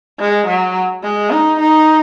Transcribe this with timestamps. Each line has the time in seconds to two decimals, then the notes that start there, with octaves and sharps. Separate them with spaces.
0.20 G#3
0.47 F#3
1.03 G#3
1.31 D#4
1.60 D#4